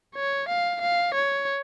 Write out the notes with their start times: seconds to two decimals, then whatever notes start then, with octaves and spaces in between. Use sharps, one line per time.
0.15 C#5
0.49 F5
0.81 F5
1.14 C#5